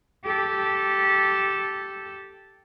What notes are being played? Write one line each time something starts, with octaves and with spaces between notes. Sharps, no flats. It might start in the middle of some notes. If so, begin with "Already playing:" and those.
G4 A4